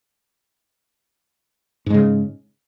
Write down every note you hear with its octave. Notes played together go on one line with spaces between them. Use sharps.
G#2 C#3 G#3